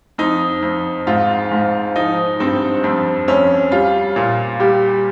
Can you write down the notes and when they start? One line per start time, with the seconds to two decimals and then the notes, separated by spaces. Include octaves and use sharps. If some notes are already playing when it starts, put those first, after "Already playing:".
0.18 F2 D#4
0.62 F2
1.07 G#2 F4
1.51 G#2
1.96 F3 D#4
2.40 G2 C4
2.84 F2 C4
3.28 F2 C#4
3.71 G3 F4
4.16 A#2
4.60 G3 G4